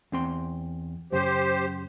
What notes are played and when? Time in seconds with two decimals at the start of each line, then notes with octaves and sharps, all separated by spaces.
0.12 E2 C4 C6
1.12 F#2 C#3 G4 C5